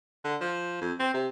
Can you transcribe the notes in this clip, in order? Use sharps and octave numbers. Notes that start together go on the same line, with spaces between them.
D3
F3
F2
C4
C3